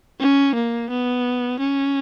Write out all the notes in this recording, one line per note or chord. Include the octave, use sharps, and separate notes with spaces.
C#4
A#3
B3
C#4